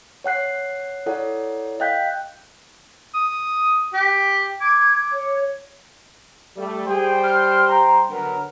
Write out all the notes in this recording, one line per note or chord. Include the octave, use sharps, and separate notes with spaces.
C#5 F#5 F#6 C7
E4 A4 C#5 D5 F#5
D#5 F5 G5 F#6 G6 B6
D#6
G4
D6 G#6
C#5
G3 A3
G3 G#4 C5 G5
F6
A#5
D3 F#3 B3 A#4